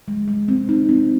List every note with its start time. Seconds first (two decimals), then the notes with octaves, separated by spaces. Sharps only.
0.08 G#3
0.28 G#3
0.48 C4
0.69 D#4
0.89 C4